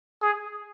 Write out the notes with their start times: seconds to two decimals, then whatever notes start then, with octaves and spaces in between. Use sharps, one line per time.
0.22 G#4